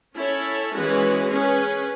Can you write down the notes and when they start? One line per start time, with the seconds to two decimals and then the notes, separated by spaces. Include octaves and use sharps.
0.16 C#4 E4 A4 C#5
0.73 E3 G#3 C#4 F#4 B4
1.31 C#4 G#4 B4